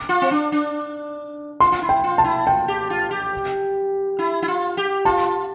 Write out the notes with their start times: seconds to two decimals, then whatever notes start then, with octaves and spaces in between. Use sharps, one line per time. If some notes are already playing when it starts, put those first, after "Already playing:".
Already playing: D6
0.09 F4
0.22 C4
0.31 D4
0.52 D4
1.60 F4 C6
1.72 F4
1.82 E4
1.89 G5
2.04 F4
2.18 A5
2.24 E4
2.46 F4 G5
2.68 G4
2.90 F4
3.11 G4
4.19 E4
4.42 E4
4.48 F4
4.77 G4
5.05 F4 A5